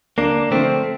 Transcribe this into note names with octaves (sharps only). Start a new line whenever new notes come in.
D2 A#3 D4
D3 F3 A3 C4